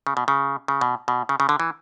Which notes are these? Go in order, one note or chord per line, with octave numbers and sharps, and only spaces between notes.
C#3
B2
C#3
C#3
B2
B2
C#3
C#3
D3
E3